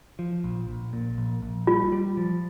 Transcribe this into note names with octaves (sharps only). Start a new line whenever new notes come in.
F3
A#1
A#1
A#2
A#1
A#1
G3 F4
G3
F3